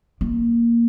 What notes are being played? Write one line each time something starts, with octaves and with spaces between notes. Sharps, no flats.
A#3